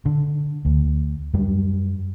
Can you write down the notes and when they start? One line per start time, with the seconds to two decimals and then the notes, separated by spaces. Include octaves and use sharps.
0.06 D3
0.65 D2
1.34 F#2 G3